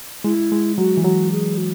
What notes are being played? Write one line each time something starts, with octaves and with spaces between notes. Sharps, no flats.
G#3 E4
G#3
F#3 F#4
E3
F#3 F#4
G#4
F#4